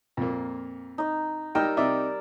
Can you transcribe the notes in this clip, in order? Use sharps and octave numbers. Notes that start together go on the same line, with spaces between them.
F2 A#2 A#3
D#4 D#5
G3 D#4 A#4 G5 E6
C3 D#4 D5 E5